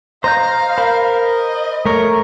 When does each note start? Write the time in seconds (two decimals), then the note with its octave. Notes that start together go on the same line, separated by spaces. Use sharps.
0.24 C5 D#5 F5 A#5 G6
0.78 A#4 C5 B5
1.24 D#5
1.86 A3 A#4 C#5